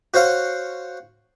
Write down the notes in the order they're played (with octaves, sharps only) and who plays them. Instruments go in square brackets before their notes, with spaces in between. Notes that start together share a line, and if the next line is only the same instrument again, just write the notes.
[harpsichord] F#4 C5 C#5 F5 F#5